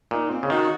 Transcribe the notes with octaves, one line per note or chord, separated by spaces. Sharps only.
A#2 D#4
C4
C#3
D#3 F#4